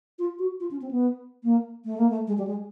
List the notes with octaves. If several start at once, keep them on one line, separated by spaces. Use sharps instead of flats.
F4
F#4
F4
C#4
C4
B3
A#3
A3
A#3
A3
G#3
G3
G#3